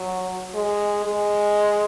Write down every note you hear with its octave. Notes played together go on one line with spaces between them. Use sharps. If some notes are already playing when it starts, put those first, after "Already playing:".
Already playing: F#3
G#3
G#3